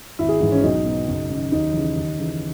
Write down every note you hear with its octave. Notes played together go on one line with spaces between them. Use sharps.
G#1 E4
G#4
G#2 E3
C#4
B1 D#4
B2
F#1
F#2 D#3
D#2 D#4
C#3 E3
D#2
C#3 E3